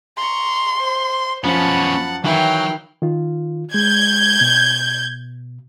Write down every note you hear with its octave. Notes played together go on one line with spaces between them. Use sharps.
A#5 C6 C#6
C5
F#2 F3 B3 C#4 F#5 A5 B5
D#3 E3 F#3 E4 F5 G5
D#3 F4
G#3 G6 G#6
B2